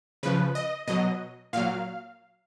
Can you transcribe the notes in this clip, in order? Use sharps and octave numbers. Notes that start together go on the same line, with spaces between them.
C#3 F3 B4
D#5
B2 F#3 D#5
A#2 F#3 F5